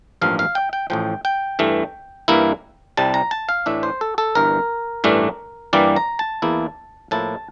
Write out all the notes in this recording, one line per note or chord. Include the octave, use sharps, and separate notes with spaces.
A1 G2 F3 A#3 F5
F5
G5
G5
A1 A2 F3 G5
G5
G2 E3 A3
G2 E3 A#3 E4
C2 C3 G3 A5
A#5
A5
F5
A2 E3 A3 D4 E5
C5
A4
A4
G1 G2 E3 A#4
A1 G2 E3 A3 D4
G2 E3 G3 A#3 D5
A#5
A5
E2 E3 A#3 E4
A2 F3 A#3 E4 A5